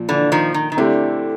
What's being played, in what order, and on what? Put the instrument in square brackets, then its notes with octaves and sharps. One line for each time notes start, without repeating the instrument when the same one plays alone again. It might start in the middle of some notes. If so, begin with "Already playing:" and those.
Already playing: [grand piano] A#2 F3
[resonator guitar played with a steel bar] D3 E3
D#3 F3
D#3
D#3
[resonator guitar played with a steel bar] D3 [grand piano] A3 C4 E4 G4